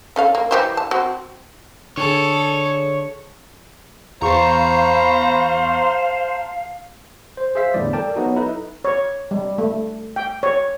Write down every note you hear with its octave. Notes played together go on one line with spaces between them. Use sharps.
C#4 A4 F5
A#3
E3 G4 C5
A5
C4 F#4
D3 G#4 A4 C#5
E2 C5 F5 A5 A#5 C#6
C5
G#4 C5 E5 F5 B6
E2 A2 D3 E3 G3 D5
A4 A#4 D5 G5 A5
F#3 B3 D#4 F#4
D#4 E4 A4 B4
C#5
G3
A3
G5
C#5